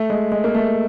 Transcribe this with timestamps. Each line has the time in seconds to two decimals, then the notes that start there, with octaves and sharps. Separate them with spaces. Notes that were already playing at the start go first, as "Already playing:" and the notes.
Already playing: A3
0.10 G#3
0.32 G#3
0.44 A#3
0.55 A3